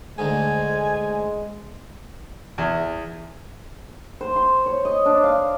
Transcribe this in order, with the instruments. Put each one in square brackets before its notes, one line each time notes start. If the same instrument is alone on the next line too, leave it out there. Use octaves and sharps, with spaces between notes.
[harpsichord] D2 G#2 [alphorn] G#3 [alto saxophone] G#5
[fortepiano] E2
[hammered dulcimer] C5
C6
C#5
D#5
D4
F5